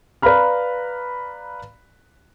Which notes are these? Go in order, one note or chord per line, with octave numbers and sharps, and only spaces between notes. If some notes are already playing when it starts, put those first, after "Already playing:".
B4 D5 F5 A#5 B5 F6